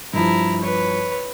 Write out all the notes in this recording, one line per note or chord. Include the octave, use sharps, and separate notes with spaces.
G2 F3 E4 A#5
B4 C#5